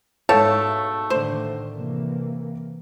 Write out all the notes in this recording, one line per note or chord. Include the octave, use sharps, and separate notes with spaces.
G#2 B2 A3 A4 C#5 F5 G5 A5
A2 D3 D#3 A3 D4 C5
C3 E3 A#3